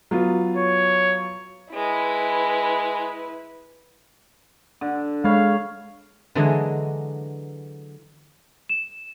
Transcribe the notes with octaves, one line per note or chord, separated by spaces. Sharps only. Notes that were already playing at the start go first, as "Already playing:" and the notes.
F#3 B3 F4
C#5
G#3 E4 B4
D3
G#3 C#5 F5 B5
D3 E3 F#3 G#3 D4 D#5
E7